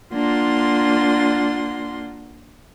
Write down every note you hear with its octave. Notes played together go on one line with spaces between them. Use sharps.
A#3 D4 F4 F#5 C6